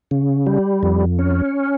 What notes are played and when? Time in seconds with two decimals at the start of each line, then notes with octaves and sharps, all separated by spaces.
0.11 C#3
0.47 G3
0.83 F2
1.19 C#4